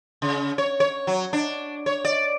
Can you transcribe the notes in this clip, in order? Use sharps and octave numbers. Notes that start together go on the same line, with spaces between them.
C#3
C#5
C#5
F#3
D4
C#5
D5